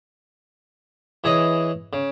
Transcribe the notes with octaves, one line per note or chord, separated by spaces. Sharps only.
E3 G#4 C#5 D#5
C#3